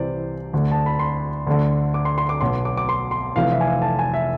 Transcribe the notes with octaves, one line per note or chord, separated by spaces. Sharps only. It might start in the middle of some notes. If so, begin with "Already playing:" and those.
Already playing: C2 C3 E3 C5 D5
D2 D3
A5
B5
C6
D2 D3
D6
C6
C6
D6
B1 B2 C6
D6
D6
C6
C6
F1 F2 E3 F5
E5
G#5
F5
A5
G#5
E5